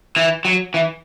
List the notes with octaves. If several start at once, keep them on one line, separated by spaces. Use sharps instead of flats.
E3
F#3
E3